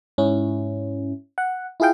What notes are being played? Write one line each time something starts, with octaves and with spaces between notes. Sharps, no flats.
G#2 C#4 E4
F#5
E4 F4 G#4 F5 G5